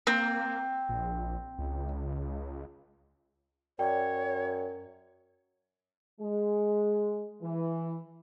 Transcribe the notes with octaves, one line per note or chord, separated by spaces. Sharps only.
A#3 C4
A#1
C#2
F#2 C#5 D5 G5
G#3
E3